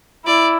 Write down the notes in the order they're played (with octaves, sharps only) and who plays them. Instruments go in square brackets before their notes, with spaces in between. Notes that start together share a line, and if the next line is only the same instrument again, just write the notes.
[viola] E4 [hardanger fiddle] D5